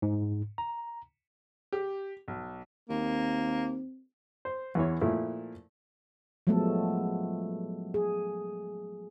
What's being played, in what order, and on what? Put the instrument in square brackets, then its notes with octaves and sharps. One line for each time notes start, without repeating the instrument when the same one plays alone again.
[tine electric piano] G#2
A#5
[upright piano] G4
B1
[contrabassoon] D#2 [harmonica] A#3 [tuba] C4
[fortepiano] C5
E2 E3 C#5
A#2 F3 A3 E4
[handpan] F3 F#3 G#3 A3 B3 A4
G#4